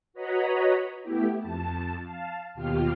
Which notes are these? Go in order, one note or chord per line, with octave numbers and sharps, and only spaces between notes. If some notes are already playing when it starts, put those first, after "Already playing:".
F#4 B4 C#5 D#5 A#5 B5
A3 B3 E4 G4
F2 A5
F5 A5
D#2 B2 F4 G4 F5 F6